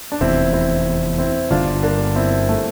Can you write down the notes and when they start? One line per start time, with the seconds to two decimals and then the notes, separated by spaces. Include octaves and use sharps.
0.12 D4
0.21 F1 E2 C3 C4 E4
0.53 C4 E4
1.18 C4 E4
1.51 G1 G2 D3 D4 F4
1.83 A#3 D4
2.16 C4 E4
2.49 A3